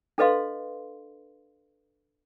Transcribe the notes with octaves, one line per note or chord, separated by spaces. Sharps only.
D4 A4 B4 D#5 F5 C6